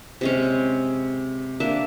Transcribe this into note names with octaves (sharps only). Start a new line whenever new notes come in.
C3 G#3 C#4
A#3 D4 E5